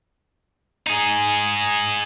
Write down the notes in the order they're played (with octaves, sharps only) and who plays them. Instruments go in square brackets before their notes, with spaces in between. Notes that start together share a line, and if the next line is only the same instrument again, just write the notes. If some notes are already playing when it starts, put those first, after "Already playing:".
[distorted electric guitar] D#4 G#4